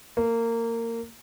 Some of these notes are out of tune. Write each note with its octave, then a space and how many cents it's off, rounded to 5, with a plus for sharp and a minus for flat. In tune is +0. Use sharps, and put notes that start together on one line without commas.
A#3 -20